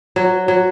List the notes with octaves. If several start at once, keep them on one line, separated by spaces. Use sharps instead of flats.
F#3
F#3